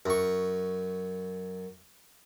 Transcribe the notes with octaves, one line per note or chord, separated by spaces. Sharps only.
F#2 C#6